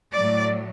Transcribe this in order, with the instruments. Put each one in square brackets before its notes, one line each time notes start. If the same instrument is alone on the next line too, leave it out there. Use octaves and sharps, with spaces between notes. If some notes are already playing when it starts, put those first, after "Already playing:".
[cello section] A2 F#3 D5